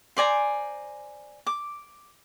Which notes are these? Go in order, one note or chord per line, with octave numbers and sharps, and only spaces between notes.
C5 D5 G#5 A#5
D6